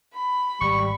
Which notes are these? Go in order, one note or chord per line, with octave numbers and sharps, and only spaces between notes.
B5
G#1 G3 C#6